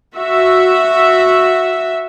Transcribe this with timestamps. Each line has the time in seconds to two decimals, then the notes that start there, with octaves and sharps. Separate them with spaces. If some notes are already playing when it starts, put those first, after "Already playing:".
0.15 F#4 E5